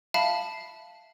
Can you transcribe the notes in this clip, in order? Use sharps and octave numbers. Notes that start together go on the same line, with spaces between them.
E5 F5 A5 B5